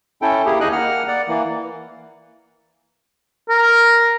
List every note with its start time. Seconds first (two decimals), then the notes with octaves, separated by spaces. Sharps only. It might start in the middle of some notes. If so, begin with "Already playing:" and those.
0.22 C#4 E4 A4 G5
0.45 A#3 E4 G4 G#4
0.61 D#2 D#4 G#4 D#5 G#5 F#6
0.72 A#3 F#5 F6
1.08 D5 F#5
1.28 E3 A#3
3.49 A#4